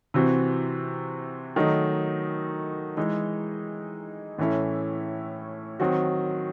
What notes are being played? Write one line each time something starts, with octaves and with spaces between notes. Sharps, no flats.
C3 E3 C4 F#4
D#3 F#3 A3 D#4
E3 G#3 D#4
A2 E3 A3 C#4 E4
D#3 F#3 C4 F#4